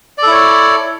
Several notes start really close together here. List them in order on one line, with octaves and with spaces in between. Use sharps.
D5 A4 E4 C#5